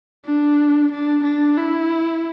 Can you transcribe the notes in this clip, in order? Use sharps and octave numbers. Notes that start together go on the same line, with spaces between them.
D4
D4
D4
E4